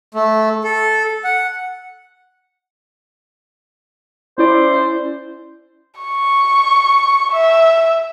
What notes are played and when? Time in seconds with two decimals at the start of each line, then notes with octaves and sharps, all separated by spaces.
0.14 A3
0.64 A4
1.24 F#5
4.38 C#4 E4 C5 D5
6.00 C#6
7.32 E5